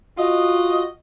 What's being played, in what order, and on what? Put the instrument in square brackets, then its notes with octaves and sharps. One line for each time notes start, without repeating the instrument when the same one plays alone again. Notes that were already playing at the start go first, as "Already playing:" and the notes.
[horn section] F4 F#4 D#5